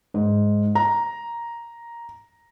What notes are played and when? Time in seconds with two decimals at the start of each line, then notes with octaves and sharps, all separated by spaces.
0.14 G#2
0.75 A#5